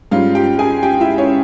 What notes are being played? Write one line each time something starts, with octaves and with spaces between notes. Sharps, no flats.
G#2 G3 C#4 F4 F5
G4 G5
G#4 G#5
G4 G5
E4 E5
C#4 C#5